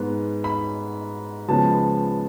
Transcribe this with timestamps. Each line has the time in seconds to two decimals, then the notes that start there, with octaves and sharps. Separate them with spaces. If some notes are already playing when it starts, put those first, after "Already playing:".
Already playing: G#2 G#3 B3
0.44 B5
1.48 C#2 C#3 F3 B3 A5